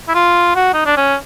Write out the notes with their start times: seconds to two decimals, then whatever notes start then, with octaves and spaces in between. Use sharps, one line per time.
0.08 E4
0.15 F4
0.56 F#4
0.74 D#4
0.86 D4
0.97 C#4